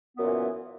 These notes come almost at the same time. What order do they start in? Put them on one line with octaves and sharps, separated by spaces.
B3 F#2 A#2 E3